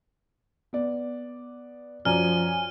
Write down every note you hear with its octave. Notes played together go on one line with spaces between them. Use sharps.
B3 D5
F#2 F3 D5 G#5 A#5 F6